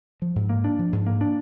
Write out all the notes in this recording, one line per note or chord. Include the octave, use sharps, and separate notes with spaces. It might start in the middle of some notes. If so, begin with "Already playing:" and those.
F3
G#2
A#3
D4
F3
G#2
A#3
D4